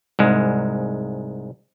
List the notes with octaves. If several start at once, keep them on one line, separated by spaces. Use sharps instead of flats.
C2 G#2 G#3